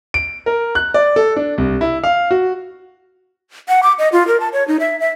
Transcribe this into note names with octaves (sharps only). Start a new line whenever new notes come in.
D7
A#4
F#6
D5
A4
D4
C2
E4
F5
F#4
F#5
D6
D#5
F4
A#4
A5
C#5
D#4
E5
E5